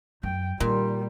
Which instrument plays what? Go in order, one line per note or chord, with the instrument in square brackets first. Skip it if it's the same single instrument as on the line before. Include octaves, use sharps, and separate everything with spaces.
[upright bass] F#2 [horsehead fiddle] G5
[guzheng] A#2 [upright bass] D#3 [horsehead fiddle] G3 [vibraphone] A#4